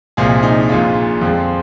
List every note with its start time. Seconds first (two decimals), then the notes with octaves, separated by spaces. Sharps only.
0.17 C2 A#2 F3 G#3 G#4
0.43 D#4
0.69 A#1 A#2 G#3 F4
1.21 F2 F3 G#3